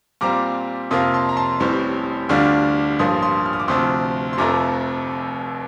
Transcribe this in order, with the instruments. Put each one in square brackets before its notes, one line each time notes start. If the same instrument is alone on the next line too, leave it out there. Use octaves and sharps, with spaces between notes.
[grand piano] A#2 G3 C4 F4 A#5 D6
F2 C3 F3 A#3 F4 C6 D#6
A5 C6
A#5
A5 C6
A1 A2 G3 C4
D2 D3 G3 D4 F4
A1 G2 F3 A#3 F4 C6 D#6
C6 D#6
F6
D#6
D6
D2 C3 F3 C4 C6 D#6
C6
F1 F2 C3 F3 A3 A#5 D6